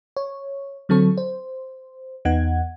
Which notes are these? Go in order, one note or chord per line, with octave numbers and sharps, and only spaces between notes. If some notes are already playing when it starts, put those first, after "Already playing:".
C#5
D3 F#3 C4 A4 C#6
C5
E2 B3 D#4 F#5 G#6